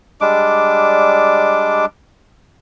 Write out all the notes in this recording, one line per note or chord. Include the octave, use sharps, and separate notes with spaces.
G3 G#3 D4 D6